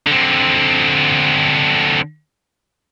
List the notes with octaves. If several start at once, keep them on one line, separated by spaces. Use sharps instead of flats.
D3 C4